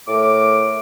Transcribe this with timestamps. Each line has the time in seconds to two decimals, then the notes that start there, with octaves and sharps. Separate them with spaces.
0.07 A2 A3 A#4 D6